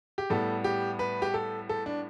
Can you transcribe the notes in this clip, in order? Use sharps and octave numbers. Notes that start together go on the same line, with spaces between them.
G4
A2 G3 B3 A4
G4
B4
G4
A4
A4
D4